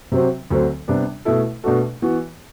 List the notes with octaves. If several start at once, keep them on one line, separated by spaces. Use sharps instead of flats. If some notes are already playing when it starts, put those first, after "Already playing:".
C3 F#3 C4 F#4
D2 D3 F#3 C4
C3 G3 B3 D4
B2 A3 E4 A4
B2 A3 D4 F#4 A4
E3 B3 F#4